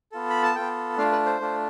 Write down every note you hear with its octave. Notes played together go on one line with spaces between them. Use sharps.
B3 F4 A4
B5
A5
B3 F4 A4 G5
A3 D4 F4 F5
B4
C5
A3 D4 F4